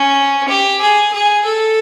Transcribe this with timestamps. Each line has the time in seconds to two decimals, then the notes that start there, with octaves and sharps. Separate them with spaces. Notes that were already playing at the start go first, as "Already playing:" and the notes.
Already playing: C#4
0.48 G4
0.81 G#4
1.13 G#4
1.45 A4